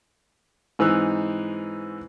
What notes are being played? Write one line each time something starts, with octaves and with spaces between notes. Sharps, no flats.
G#2 E3 C4 D#4 E6 F#6